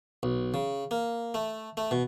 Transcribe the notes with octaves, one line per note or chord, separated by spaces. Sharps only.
B1
C#3
A#3
A3
A3
B2